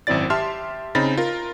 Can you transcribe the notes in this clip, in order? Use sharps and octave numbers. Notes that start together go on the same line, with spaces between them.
G#1 F#2 C4 E4 D5 A6
G4 E5 A5 C6 F6
C#3 C4 D#4 B5 A6 A#6
F4 A#4